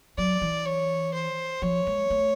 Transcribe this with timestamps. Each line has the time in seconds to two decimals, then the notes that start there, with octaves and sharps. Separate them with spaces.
0.18 F#3 D5
0.42 E3
0.65 C#5
1.14 C5
1.62 F3 C#5
1.87 G#3
2.10 A3